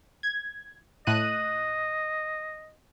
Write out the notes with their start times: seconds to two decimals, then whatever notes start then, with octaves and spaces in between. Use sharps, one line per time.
0.23 G#6
1.07 A2 D#5 F#6 D#7